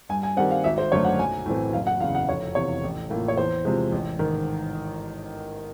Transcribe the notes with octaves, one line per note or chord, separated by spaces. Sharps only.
G2 G#5
G#5
D#3 G3 C4 F#5
F5
G#1 E5
C5
F#2 D3 F#3 A3 C#5
F#5
B1 G#5
A2 E3 A3 C4
F#1 F5
F#5
E2 C#3 F5
F#5
F1 C#5
E2 C3 C#5
A1
A2 F3 A#3
C#5
E2 C5
C3 F3 G#3
A1
G#2 D#3